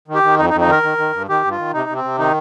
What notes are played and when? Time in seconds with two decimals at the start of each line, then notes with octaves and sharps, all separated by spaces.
0.08 D#3
0.15 G4
0.23 D#3
0.38 F2 D#4
0.50 D#4
0.54 F2
0.61 D#4
0.68 D#3 A#4
0.83 D#3
0.98 D#3
1.13 G2
1.28 D#3 G4
1.43 G2
1.51 F4
1.58 D#3
1.73 C3 D#4
1.89 C3
1.96 C4
2.04 C3
2.19 D#3 D#4